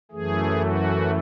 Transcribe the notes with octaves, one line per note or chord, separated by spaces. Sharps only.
F#2 E3 A3 G#4
F#4